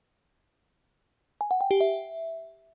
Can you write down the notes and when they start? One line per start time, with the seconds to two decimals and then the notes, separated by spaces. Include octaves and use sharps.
1.41 G#5
1.51 F#5
1.61 G5
1.71 G4
1.81 E5